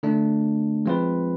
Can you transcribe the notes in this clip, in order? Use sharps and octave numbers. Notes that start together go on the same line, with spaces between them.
D3 A3 D4
F3 G#3 C4 F4 B4